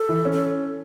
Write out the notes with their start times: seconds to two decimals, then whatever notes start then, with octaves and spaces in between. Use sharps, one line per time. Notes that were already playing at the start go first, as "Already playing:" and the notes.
Already playing: A4
0.09 E3
0.25 C#4
0.32 A4